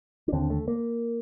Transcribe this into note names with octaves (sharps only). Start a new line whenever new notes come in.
D4
D#2 D3 C4
A3
A#3